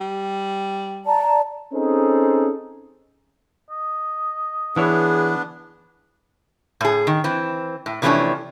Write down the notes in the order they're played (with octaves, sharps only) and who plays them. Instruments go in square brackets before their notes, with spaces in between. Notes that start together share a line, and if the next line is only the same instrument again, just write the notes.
[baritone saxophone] G3
[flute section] D5 A5 A#5
[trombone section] C4 C#4 D#4 G#4 A4 C5
[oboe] D#5
[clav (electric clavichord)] E3 E4 C#5 [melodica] B3 D4 [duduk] G#4
[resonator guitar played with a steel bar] A2 G#4
D#3
E3 C4
A2
C3 E3 F3 A3 C#4 D4